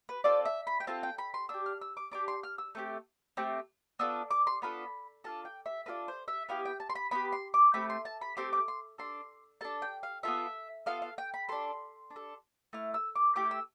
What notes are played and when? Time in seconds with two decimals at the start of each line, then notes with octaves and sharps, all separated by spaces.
0.09 B4
0.24 C4 F4 A4 D5
0.45 E5
0.67 B5
0.80 G5
0.87 C4 F4 A4 A5
1.03 G5
1.18 B5
1.34 C6
1.49 D4 G4 E6
1.66 F6
1.82 E6
1.97 D6
2.12 D4 G4 D6
2.28 C6
2.43 F6
2.58 E6
2.75 A3 C4 G4
3.37 A3 C4 G4
3.99 B3 D4 F4 A4 E6
4.31 D6
4.47 C6
4.62 B3 D4 F4 A4 B5
5.24 D4 F4 A4 A5
5.45 G5
5.66 E5
5.86 D4 F4 A4 B4
6.08 C5
6.28 E5
6.49 B3 E4 G4 F5
6.65 G5
6.80 A5
6.90 C6
6.95 B5
7.11 B3 E4 G4 B5
7.33 C6
7.54 D6
7.74 A3 C4 G4 B5
7.90 C6
8.05 A5
8.21 B5
8.37 A3 C4 G4 C6
8.53 D6
8.68 C6
8.98 D4 A4 C6
9.61 D4 A4 A5
9.82 G5
10.03 F5
10.23 B3 F4 A4 E5
10.86 B3 F4 A4 F5
11.02 F5
11.18 G5
11.34 B5
11.49 D4 A4 C6
12.11 D4
12.16 A4
12.73 A3 E4 F6
12.94 E6
13.15 D6
13.36 A3 E4 G4 D6
13.51 E6